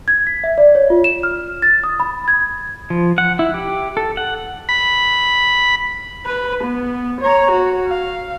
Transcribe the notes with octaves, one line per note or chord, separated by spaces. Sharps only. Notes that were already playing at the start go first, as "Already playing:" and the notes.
G#6
B6
E5
D5
C#5
F4
E7
F6
A6
D#6
B5
G#6
F3
F#5
E4
G4
A4
F#5
B5
B4
B3
C#5 A#5
F#4
F5